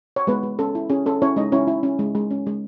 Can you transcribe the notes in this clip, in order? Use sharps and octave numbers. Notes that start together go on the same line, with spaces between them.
C#5
G#3 B3 B4
G#3
C#4 A4
E4
C#4 G#4
C#4 A4
C#4 E4 C#5
G#3 D#4 D#5
C#4 E4 C#5
E4
C#4
G#3
G#3
C#4
G#3